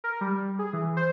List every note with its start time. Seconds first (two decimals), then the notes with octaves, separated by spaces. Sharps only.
0.04 A#4
0.21 G3
0.59 G#4
0.73 E3
0.97 C5